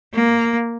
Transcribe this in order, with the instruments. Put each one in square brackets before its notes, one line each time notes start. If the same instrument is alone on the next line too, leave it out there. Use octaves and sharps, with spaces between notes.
[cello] A#3